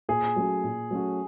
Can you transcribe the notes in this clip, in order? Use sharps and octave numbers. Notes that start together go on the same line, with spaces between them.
A#2 G#4
F#3 A3 C#4 F#4
A#2
F#3 A3 C#4 F#4